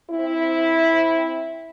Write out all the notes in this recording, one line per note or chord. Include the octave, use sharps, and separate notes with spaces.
C4 E4